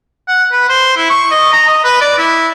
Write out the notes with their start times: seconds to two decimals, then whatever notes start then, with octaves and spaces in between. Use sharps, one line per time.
0.27 F#5
0.52 B4
0.69 C5
0.97 E4
1.09 C#6
1.31 D#5
1.53 A#5
1.67 D#5
1.84 B4
2.01 D5
2.18 E4